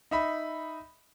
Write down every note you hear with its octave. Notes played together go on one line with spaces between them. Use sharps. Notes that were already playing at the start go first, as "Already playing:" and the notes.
D#4 E5 B5